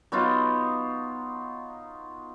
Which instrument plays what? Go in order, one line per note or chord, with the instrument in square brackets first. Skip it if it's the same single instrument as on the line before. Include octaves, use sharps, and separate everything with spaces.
[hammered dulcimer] F#3 B3 D#4 F4